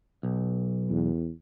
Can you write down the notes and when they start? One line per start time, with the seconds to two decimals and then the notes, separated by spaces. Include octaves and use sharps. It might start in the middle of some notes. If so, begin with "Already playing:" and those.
0.23 B1
0.89 E2